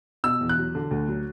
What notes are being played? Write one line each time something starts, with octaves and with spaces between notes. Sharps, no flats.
B2 E6
E2
F#6
F#3
D3
D2
F#3